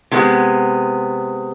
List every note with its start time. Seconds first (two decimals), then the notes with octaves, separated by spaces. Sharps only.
0.12 C3 G#3 B3